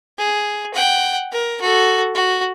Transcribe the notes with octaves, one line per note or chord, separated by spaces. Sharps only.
G#4
F#5 G5
A#4
F#4 A4
F#4